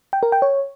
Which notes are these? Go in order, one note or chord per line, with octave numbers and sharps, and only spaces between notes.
G5
A#4
G5
C#5